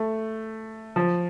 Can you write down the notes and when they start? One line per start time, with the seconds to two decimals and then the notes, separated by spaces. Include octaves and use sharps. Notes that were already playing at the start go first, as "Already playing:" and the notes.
Already playing: A3
0.96 F3